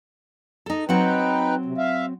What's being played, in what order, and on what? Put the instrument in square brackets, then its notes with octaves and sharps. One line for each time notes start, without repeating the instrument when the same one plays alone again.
[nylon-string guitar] D#4 A4
[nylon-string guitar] F#3 C4 F#5 [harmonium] D#4 B4 G5
[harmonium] C3
E5 F5